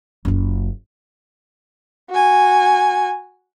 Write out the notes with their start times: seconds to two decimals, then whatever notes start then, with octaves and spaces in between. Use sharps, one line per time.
0.25 F#1 F4
2.11 F#4 G#5